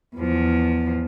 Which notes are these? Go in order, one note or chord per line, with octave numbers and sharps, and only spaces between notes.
E2 F3